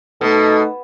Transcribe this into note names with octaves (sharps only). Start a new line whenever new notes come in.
B2 A3 D#4 A4